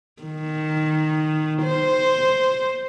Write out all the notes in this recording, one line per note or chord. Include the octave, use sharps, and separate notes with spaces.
D#3
C5